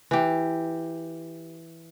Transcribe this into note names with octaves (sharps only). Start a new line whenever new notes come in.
E3 G4